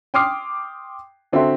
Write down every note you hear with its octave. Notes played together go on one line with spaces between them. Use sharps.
G5 C6 D6 D#6 F6 C7
D3 C4 F#4 A4 E5 C6